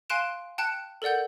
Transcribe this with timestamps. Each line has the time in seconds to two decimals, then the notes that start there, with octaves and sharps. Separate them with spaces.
0.10 F5 G#5 C6 F#6 D7 E7
0.58 G5 A5 F#6 C#7
1.02 A4 A#4 D5 F#5 G6